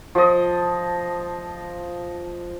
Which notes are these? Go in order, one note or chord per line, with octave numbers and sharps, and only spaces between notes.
F3 D#5